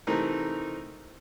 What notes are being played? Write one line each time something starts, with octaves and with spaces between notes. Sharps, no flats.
C3 E3 A3 C4 D#4 A#4